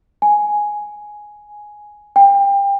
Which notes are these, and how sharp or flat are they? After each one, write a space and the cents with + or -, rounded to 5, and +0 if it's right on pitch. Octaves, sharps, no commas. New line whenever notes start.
G#5 +5
G5 +30